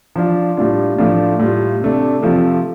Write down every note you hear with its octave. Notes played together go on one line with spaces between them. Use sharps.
F3 D4 F4
A2 G3 D4 F4
A2 F3 A3 D4 F4
A2 G3 F4
C3 A3 D4
C3 F3 A3 F4